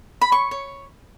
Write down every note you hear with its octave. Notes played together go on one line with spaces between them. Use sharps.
B5
C#5 C#6
C#5